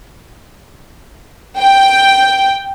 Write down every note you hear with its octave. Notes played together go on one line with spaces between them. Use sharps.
G5